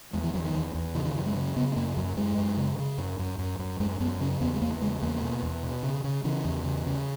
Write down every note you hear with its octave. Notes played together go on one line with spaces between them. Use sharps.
E2 G#3
E3
E2 F#3
D#3
E2
E2
C#3 E3
D#3
F#2 E3
G#3
C#3
C#3 B3
B3
F#2 A#3
F#2 F#3
F#2 G#3
F#2
C#3
C#3
F#2
F#2
F#2
F#2
F#2 G#3
F#2 B3
C#3 C#4
E2 B3
G#3
E2 A#3
C#3 G#3
E2 A#3
B2
E2
B2
C#3
C#3
C#3 E3
E2
C#3
C#3